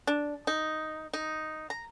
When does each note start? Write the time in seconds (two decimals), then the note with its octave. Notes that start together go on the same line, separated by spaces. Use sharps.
0.07 D4
0.47 D#4
1.13 D#4
1.70 A#5